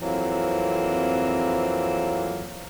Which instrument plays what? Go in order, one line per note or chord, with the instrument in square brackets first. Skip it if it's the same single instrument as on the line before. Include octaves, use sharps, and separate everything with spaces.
[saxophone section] F2 E3 F#3 A#3 C4